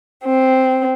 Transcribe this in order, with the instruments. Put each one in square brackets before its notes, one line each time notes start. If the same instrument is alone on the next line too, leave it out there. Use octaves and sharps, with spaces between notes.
[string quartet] C4